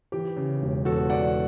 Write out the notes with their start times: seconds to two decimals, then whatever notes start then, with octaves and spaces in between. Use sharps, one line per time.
0.12 E3 G4
0.36 C#3
0.62 E1
0.85 E2 F#4 A4
1.10 E3 D5 F#5